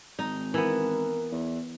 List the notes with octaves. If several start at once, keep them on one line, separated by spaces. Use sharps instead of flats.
G#1 D#4
E3 B3 A#4
E2